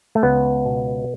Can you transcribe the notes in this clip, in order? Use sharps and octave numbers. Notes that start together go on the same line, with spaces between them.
A3
C#2 B3
B2